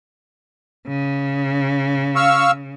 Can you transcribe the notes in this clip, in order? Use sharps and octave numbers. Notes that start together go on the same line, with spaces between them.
C#3
F5 C#6 E6